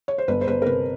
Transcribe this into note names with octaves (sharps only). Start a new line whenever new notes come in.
C#5
C5
G1 B4
C5
G1 B4
A#4
C3 B4